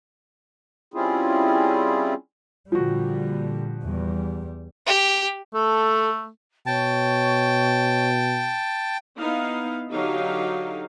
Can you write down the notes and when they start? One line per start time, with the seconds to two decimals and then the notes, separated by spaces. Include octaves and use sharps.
0.94 G3 C4 C#4 E4 F4 G#4
2.72 A#2 D3 F3 G3 F#4
3.84 E2 G3
4.87 G4
5.54 A3 A4
6.66 B2 C#5 G5 A5
9.19 B3 D#4 E4 F5
9.91 D3 F#3 D#4 G4 F5